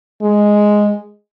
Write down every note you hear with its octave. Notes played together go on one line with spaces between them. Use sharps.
G#3